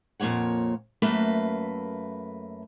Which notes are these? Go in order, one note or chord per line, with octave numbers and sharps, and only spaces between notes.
F2 A#2 A#3 C#5 F#5
F#2 A3 A#3 B4 E5